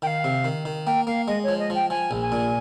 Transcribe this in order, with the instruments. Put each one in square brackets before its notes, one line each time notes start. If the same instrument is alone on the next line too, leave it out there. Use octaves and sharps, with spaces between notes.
[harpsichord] D#3 [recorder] G5
[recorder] F5
[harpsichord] C3
D#3
D#3
[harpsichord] A#3 [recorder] G5
[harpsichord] A#3 [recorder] F5
[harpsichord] G#3 [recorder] D#5
[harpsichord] F3 [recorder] C#5
[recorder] D#5
[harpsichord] F3 [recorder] G5
[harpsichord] F3 [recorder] G#5
[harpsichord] A#1
[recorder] G#5
[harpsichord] A#2